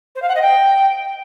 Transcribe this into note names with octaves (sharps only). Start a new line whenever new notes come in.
C5
F5
F#5
D#5
G5